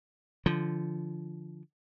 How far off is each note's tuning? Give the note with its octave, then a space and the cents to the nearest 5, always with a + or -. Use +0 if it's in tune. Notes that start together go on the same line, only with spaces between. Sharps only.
D3 +0 F3 -15